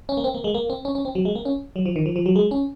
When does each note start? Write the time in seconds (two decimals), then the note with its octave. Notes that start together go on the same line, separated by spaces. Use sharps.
0.09 C#4
0.17 A#3
0.24 C4
0.34 A#3
0.44 G#3
0.55 A#3
0.70 C4
0.85 C#4
0.95 C#4
1.05 C4
1.15 F#3
1.25 G#3
1.35 A#3
1.45 C#4
1.76 F#3
1.86 F3
1.96 D#3
2.06 F3
2.16 F3
2.26 F#3
2.36 G#3
2.51 C#4